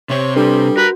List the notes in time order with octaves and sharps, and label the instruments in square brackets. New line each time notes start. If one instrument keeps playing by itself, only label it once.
[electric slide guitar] C3 C4 [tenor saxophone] C#5
[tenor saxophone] G3 [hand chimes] D4 A4 B4
[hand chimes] F#4 [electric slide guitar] A#4 [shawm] B4